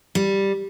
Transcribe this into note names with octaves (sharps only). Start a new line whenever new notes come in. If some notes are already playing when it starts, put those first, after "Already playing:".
G3